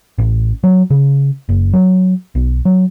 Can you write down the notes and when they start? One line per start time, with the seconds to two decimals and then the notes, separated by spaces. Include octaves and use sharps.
0.18 A1
0.64 F#3
0.90 C#3
1.49 F#1
1.73 F#3
2.35 B1
2.65 F#3